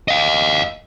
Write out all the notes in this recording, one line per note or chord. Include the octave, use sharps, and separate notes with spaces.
D#5 F5